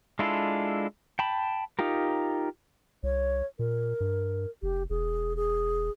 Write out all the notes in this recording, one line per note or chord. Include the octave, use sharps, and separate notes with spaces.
G#3 D4 E4 F4 A4
G5 A5 B5
D#4 F4 G4 A#4
C2 C#5
A#2 A#4
G2
F1 G4
E1 G#4
G#4